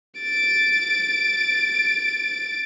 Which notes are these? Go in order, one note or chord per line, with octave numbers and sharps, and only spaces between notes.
A6 D7